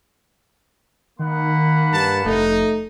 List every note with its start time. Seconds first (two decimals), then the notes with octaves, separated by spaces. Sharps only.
1.19 D#3 A#3 F#5 B5
1.93 G2 A5
2.25 F1 A3 D#4